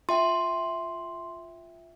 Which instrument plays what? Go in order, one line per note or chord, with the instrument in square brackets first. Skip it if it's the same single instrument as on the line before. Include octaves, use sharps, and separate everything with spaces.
[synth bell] F4 E5 G5 [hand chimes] C6